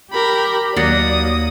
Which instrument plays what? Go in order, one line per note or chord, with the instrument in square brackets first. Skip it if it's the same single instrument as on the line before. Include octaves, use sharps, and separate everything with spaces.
[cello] G4 [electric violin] A#4 B5
[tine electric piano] D#2 A6 C#7 [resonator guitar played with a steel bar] F#3 [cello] A#3 D5 [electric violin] D#6